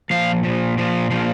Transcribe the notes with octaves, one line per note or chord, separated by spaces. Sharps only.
A#2 F3 F5
A#2 F3
A#2 F3
A#2 F3